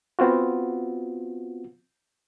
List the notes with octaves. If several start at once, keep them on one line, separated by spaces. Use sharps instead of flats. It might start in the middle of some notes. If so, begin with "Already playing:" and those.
B3 C4 F4 F#4